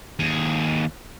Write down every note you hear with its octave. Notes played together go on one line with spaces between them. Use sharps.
D#2 G#4